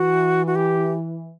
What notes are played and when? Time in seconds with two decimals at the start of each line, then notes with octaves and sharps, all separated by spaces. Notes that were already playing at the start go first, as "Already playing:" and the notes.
Already playing: E3 F#4
0.47 F#4
0.55 G4